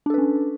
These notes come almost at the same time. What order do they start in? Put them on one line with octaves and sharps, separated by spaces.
D4 A4 B4 C#4